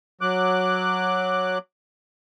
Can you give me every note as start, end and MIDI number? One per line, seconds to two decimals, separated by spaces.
0.21 1.58 54
0.21 1.58 86
0.21 1.58 90